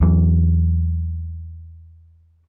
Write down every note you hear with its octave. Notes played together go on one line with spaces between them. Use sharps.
E2 E3 F#3